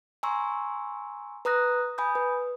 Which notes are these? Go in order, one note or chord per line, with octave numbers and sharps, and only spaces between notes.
G#5 A#5 C6 C#6 E6
B4 A#5 D#6 F#6 A#6
G#5 B5 D#6 G6
B4